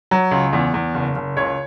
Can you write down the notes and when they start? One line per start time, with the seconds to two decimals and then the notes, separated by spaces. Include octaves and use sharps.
0.11 F#3
0.31 C#2
0.53 E2
0.74 E2
0.94 F#1
1.16 F#1
1.37 C#2 C#5